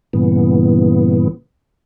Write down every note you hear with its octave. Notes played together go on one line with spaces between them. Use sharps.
G2 A#2 C#3 E3 B3